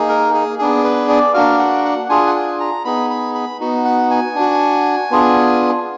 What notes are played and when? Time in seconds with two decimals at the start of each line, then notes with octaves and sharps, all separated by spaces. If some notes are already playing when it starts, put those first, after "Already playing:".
Already playing: A#3 D#4 G#4
0.09 A#4
0.34 G#4
0.59 B3 D4 G#4
0.84 B4
1.09 D5
1.34 A#3 D4 F#4 F5
1.59 F#5
1.85 F#5
2.09 D4 F4 G#4 G#5
2.27 F#5
2.35 G#5
2.60 A#5
2.85 B3 D#4 G#4 B5
3.10 B5
3.35 B5
3.60 B3 D#4 F#4
3.85 F#5
4.11 G#5
4.35 D4 F#4
5.11 B3 D4 F4 G#4